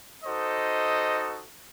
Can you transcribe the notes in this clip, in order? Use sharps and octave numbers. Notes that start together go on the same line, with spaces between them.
D#4 F#4 A4 C5 D#5